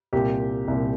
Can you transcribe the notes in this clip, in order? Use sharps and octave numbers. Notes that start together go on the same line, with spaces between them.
C2 A#2 G4
C2 A#2